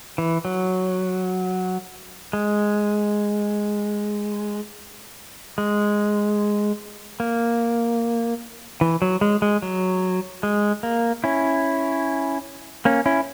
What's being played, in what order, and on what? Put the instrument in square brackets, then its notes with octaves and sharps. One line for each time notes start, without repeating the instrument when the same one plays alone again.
[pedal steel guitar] E3
F#3
G#3
G#3
A#3
E3
F#3
G#3
G#3
F#3
G#3
A#3
C#4 E4
A#3 C#4
C#4 E4